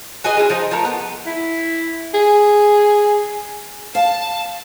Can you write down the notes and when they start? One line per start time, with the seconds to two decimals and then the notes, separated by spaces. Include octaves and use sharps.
0.24 F#4 G#4 B4 D#5
0.37 G#3 C#4 F#4 G#4
0.50 F3 D#4
0.71 F3 A3 A#4
0.85 B3
1.26 E4
2.14 G#4
3.95 F5 A5